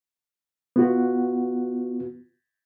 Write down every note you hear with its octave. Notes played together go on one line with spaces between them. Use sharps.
B3 F4 F#4